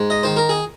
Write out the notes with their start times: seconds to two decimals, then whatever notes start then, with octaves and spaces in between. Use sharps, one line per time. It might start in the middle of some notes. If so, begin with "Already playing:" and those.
Already playing: G#2
0.10 D#5
0.23 D#3 C5
0.36 A#4
0.49 G#4